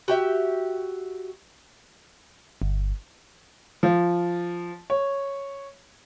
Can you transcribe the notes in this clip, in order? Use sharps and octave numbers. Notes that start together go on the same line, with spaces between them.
F#4 G4 E5
G1
F3
C#5